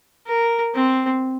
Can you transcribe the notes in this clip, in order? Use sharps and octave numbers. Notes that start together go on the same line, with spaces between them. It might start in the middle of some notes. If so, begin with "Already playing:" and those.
A#4
C4